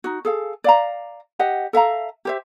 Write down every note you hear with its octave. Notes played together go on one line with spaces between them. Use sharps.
D#4 F#4
G#4 A4 F5
D5 F5 A#5
G4 D#5 F#5
A4 E5 F5 A#5
G4 C5 E5